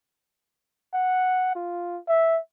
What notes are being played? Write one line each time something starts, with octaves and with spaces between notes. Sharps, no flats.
F#5
F4
E5